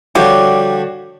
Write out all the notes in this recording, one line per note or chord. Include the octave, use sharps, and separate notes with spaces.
D3 F3 G3 F#4 G4 C#5 D5